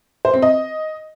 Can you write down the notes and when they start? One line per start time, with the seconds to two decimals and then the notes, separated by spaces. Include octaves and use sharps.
0.25 C5
0.34 C4
0.42 D#5